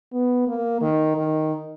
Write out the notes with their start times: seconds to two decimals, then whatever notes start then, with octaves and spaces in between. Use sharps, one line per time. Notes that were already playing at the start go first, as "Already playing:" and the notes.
0.12 B3
0.47 A#3
0.81 D#3
1.16 D#3